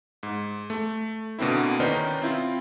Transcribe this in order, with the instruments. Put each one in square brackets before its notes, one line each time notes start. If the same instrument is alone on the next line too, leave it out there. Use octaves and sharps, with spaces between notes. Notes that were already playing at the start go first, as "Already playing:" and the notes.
[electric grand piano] G#2
A3
B2 D3 A#3 C4 E4
D#3 C#4 D#4 B4 C5 D5
C4 E4 F4